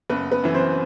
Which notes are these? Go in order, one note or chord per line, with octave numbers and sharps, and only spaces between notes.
F#1 B3 B4
B3 B4
F#2 E3
C4 C5